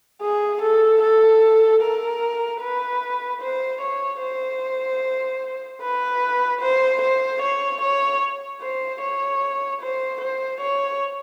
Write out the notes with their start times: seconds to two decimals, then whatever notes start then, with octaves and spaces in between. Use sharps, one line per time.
0.22 G#4
0.62 A4
1.02 A4
1.82 A#4
2.61 B4
3.41 C5
3.81 C#5
4.22 C5
5.82 B4
6.61 C5
7.01 C5
7.42 C#5
7.81 C#5
8.61 C5
9.02 C#5
9.81 C5
10.21 C5
10.61 C#5